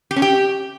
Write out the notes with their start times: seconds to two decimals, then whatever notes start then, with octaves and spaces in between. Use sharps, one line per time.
0.11 G4
0.16 C#4
0.22 G4